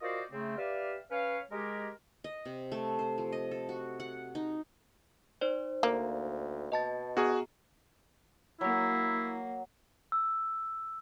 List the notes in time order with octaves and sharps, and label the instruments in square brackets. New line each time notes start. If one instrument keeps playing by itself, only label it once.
[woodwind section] F4 F#4 A#4 C5 D5 D#5
C#3 A3 C4
G4 B4 D5 E5 F5
C#4 B4 C#5 F5
G#3 G4 A#4
[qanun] D#5
C3
A3
C5
F3
D#5
A4
F#4
F#5
D#4
[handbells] D#4 C5 D5
[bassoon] D2 [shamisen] A#3
[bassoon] B2 [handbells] D#5 A5 A6
[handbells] B3 A#5 [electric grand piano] F#4 G#4
[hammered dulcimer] F#3 [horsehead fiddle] A#3 [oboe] E4
[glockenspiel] E6